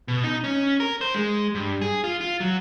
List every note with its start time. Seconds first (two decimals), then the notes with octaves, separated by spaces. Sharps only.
0.08 B2
0.24 D#4
0.44 C#4
0.80 A#4
1.01 C5
1.15 G#3
1.55 G2
1.81 G#4
2.04 F4
2.21 F4
2.40 F#3